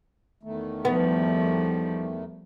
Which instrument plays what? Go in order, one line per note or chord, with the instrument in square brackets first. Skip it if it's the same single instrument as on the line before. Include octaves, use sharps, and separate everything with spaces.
[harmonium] E2 D#3 A3
[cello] F3 G3 [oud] B3